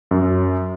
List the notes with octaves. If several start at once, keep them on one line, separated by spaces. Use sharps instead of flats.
F#2